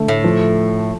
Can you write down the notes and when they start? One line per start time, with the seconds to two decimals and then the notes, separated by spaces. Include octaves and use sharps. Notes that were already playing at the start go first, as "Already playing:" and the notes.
Already playing: D3 A3
0.08 A2
0.24 F3